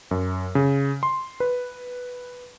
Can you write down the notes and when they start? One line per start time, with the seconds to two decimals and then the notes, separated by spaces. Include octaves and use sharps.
0.11 F#2
0.55 C#3
1.03 C6
1.40 B4